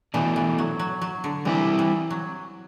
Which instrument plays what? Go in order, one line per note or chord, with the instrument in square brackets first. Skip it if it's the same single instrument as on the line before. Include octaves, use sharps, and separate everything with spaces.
[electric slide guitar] B2 A3 D4 [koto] E3
[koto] E3
F#3
F#3
F#3
D3
[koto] E3 [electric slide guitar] G3 C4 E4
[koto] E3
F#3